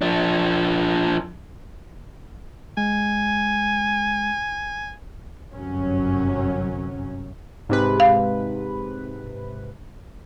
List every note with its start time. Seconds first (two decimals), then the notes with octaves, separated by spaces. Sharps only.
0.02 F3 D4
2.77 G#3 G#5
5.52 G1 F#2 C3 F#3 C#4
7.69 G#2 C3 B4
8.00 F5